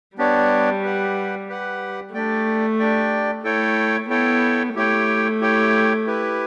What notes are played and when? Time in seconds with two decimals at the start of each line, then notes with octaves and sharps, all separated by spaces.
0.17 G3 B3 D4 G4 C#5
0.82 G4 B4 F#5
1.48 G4 B4 F#5
2.14 A3 D4 G4 D5 G5
2.79 D4 G4 D5 G5
3.44 A3 E4 A4 C#5 G5
4.10 B3 E4 A4 C#5 G5
4.75 A3 E4 G4 C#5 G5
5.41 E4 G4 C#5 G5
6.06 E4 G4 B4